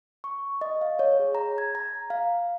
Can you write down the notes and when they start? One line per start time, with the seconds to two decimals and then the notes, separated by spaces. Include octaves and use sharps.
0.24 C#6
0.61 D#5
0.81 F5
0.99 C#5
1.19 G#4
1.35 A#5
1.58 G#6
1.75 A#5
2.10 F5